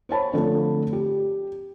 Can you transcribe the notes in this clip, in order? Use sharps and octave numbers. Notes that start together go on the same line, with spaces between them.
C5 C#5 A5 B5
D3 F3 A3 C4 A4
G4